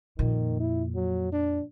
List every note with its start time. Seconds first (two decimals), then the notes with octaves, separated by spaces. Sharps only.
0.19 F2 A#2 D#3
0.60 E4
0.95 F#3
1.32 D4